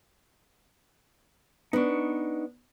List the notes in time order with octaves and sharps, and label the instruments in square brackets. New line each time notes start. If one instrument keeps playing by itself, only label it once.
[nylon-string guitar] B3 D4 [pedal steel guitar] D#4 C#6